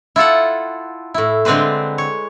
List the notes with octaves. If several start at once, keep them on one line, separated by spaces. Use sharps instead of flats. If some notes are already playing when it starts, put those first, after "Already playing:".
E4 F4 A4 F#5
A2 E4
D3 G#3 C4 D4 B4 C5
C#5